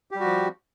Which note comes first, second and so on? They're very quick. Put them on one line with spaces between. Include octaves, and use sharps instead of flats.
G4 G3 F#4 F3